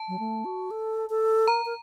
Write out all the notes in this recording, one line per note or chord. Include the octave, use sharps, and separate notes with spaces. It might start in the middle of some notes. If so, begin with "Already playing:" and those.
Already playing: A5
F#3
A3
F#4
A4
A4
A#4 A#5
A#4